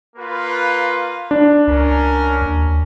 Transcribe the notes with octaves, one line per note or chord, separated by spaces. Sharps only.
A#3 F4 B4
D4
C#2 C#4 A#4
D#2